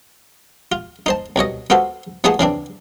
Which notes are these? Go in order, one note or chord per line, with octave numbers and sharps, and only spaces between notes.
F4
D#4 C5 A5
C2 B2 C#5 D#5
B3 F4 F#4 A4 C5
F3 A3 B3 D#4 G#4 A5
C#3 E3 C4 D4